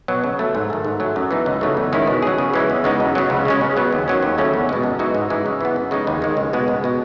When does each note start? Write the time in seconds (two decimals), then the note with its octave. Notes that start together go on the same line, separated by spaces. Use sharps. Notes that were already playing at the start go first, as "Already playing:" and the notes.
0.08 B2 F#3
0.24 C#3
0.39 F#3 A3
0.55 G#2
0.70 D#3 A3
0.85 G#2
1.00 F#3 A3
1.16 F#2
1.31 E3 B3 D#4
1.46 C#2
1.61 C#3 F#3 A3 D#4
1.77 E2
1.93 D#3 G#3 C#4 E4
2.07 B2
2.23 F#3 C#4 G#4
2.38 C#3
2.54 E3 G#3 C#4
2.70 E2
2.84 C#3 G#3 B3 D#4
3.00 F#2
3.15 C#3 F#3
3.30 C#2
3.45 C#3 G#3 C#4
3.61 C#3
3.77 F#3 B3
3.92 D#2
4.08 D#3 F#3 C#4
4.23 D#2
4.38 C#3 F#3 A3 C#4
4.54 E2
4.69 B2 G#3
4.83 F#2
4.99 E3 G#3 D#4 F#4
5.15 G#2
5.30 E3 G#3 D#4
5.46 C#3
5.61 E3 B3
5.76 F#2
5.91 C#3 G#3 D#4
6.07 D#2
6.22 D#3 G#3
6.37 C#2
6.53 B2 G#3 B3
6.68 C#2
6.84 B2 G#3